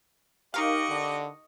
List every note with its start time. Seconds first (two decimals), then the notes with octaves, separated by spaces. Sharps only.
0.54 D#4 G4 A#4 D#5 F5 C#6 D6 F#6
0.89 D3